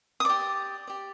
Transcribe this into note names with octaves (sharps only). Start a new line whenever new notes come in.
D#6
G4 D5 D6
G4 D5